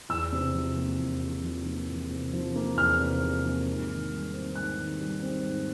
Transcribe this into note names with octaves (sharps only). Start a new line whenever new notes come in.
E2 E6
C3
F3
A#3
E2
C3
F3
A#3
E2
C3
F3
A#3
E2 F6
C3
F3
A#3
G#2
D#3
G3
C4
G#2 F#6
D#3
G3
C4
G#2